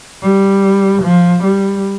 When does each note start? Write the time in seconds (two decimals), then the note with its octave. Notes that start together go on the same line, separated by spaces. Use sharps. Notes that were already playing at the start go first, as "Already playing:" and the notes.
0.22 G3
1.03 F3
1.44 G3